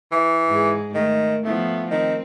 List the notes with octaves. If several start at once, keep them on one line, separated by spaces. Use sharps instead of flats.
E3
G#2 G#4
D#3 A3
F3 A3 B3
D#3 C4